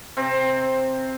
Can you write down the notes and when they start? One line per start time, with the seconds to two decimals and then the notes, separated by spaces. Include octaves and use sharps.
0.17 C3 C4